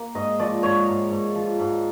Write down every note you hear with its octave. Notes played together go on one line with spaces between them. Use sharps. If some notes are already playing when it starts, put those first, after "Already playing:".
Already playing: A#3
G#2 D#5
F3 D5
G#2 C#5
G#2
G#2
F3
G#2